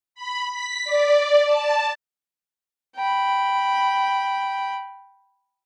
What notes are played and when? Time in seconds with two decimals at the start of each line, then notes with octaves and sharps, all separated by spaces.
0.15 B5
0.48 B6
0.85 D5
1.46 A5
2.96 G5 B5